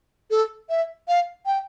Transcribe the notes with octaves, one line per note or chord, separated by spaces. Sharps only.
A4
E5
F5
G5